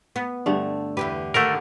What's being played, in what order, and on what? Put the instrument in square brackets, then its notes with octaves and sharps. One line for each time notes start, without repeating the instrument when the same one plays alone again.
[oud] B3
[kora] G2 D3 A3
[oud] E2 D3 B4 [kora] G4
[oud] D3 D#3 A4 [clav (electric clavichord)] A3 A#4